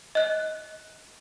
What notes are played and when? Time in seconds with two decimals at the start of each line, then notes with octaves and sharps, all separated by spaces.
0.15 D#5 F#6